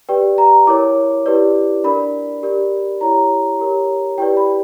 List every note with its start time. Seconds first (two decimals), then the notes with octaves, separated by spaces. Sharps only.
0.09 G4 B4 D5 G5
0.38 A#5
0.67 E4 A#4 C#5 D6
1.26 E4 G4 B4 D5
1.84 D4 A#4 D5 B5
2.43 G4 A#4 D5
3.01 E4 G4 C#5 A#5
3.59 G4 A#4 C#5
4.18 E4 G4 B4 D5 G5
4.37 B5